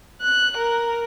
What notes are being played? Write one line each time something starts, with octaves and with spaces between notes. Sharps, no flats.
F#6
A#4